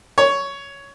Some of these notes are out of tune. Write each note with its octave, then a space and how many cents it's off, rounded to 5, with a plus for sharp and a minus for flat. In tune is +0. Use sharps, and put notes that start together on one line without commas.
C#5 +10